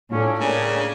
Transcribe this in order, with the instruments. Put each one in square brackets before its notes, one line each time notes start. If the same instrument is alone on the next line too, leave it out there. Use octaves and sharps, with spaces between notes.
[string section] A2 D4 [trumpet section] C#4 [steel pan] F4 A4
[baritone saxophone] C#3 [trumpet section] G3 A#3 D4 [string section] G#5